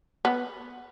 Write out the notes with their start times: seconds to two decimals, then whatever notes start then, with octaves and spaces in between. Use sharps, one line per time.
0.25 B3